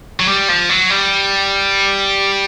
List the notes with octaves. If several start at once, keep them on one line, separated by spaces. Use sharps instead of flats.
F#3
G3
F3
F#3
G3